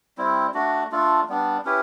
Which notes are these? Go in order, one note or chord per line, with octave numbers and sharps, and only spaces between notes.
G3 C4 E4
A3 D4 F#4
A3 D4 F4 A4
G3 B3 D4
C#4 E4 G4 B4